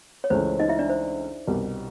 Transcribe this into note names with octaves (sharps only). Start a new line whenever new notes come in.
C#5
C#2 C#3 E3 A3 C#4 C5
D#4 D#5
E4 E5
D4 D5
C5
C2 B2 G3